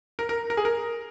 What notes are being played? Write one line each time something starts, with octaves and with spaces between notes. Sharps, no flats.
A#4
A#4
A#4
G#4
A#4